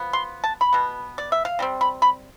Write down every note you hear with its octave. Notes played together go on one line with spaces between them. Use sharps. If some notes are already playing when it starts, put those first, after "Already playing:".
Already playing: F3 B3
C6
A5
B5
B2 B3
D5
E5
F5
C3 G3 C4
B5
B5